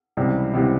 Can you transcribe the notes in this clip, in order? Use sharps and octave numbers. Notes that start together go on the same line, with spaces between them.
C#2 C3 E3 G3
C#2 C3 E3 G3